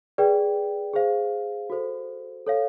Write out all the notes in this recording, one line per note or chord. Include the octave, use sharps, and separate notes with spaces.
G#4 B4 D5 G5
G#4 C5 F5
F#4 A4 C5
A4 C#5 F5